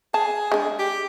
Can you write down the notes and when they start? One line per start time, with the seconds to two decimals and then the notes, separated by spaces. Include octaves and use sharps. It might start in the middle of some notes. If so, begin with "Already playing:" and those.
0.14 G#4 A5
0.52 G#3 D4
0.79 G4